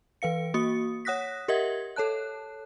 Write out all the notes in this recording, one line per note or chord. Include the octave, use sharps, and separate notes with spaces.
E3 B4 F5 C#7
A#3 F#4 D#6 C#7
C#5 F#5 D#6 F#6 A#6 B6
G4 A#4 D#5 E5 F#5 G#6
A4 C#5 A5 F#6